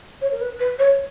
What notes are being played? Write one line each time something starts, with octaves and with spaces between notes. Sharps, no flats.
C#5
A#4
B4
B4
C#5